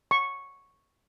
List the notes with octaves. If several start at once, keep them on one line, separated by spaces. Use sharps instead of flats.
C#6